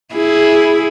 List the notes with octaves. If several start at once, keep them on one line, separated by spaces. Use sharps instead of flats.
E4 G#4